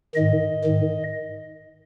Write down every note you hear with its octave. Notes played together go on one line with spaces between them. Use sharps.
G#2 D#3 D#5
G#2 D#3